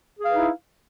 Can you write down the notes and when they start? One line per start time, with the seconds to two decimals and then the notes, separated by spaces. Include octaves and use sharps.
0.18 G#4
0.23 F5
0.27 B4
0.32 D#4
0.37 E4